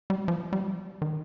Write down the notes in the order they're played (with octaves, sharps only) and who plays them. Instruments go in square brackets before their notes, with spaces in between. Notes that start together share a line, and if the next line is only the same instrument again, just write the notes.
[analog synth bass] G3
F3
G3
D#3